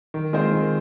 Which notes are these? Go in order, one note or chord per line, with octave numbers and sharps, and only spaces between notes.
D#3
G#3 C4 F4 C5
D#3